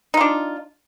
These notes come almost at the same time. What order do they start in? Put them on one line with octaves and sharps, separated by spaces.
D#4 F4 D4